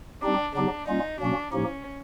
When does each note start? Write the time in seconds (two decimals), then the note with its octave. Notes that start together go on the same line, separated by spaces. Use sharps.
0.22 G3 C4 D4 D#4 G4
0.55 C#3 F#3 B3 D4 D#4 G4
0.87 G3 A#3 C#4 D#4 F4
1.20 B2 F#3 A#3 C#4 D4 F#4
1.52 A2 F3 A#3 C#4 D#4 G4